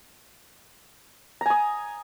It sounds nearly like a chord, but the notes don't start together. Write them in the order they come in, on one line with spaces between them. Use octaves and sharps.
A#5 G#5 D#6